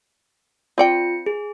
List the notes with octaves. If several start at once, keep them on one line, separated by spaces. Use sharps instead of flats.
C4 F4 D5 G5 C#7
G#4